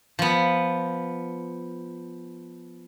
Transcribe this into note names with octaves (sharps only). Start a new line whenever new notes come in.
F3 B3